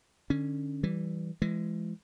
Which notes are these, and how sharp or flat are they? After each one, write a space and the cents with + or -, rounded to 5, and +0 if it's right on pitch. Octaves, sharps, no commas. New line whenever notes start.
D3 +20 C#4 +0
E3 +0 G3 -10
E3 +30 G#3 +10